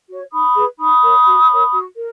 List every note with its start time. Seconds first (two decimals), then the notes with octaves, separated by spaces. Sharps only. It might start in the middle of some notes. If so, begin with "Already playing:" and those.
0.09 F#4 C#5
0.31 D#4 B5 D#6
0.55 G#4 B4
0.78 D#4 B5 D#6
1.02 A#4 C#5
1.26 F#4
1.50 A#4 C#5
1.73 F#4
1.96 A#4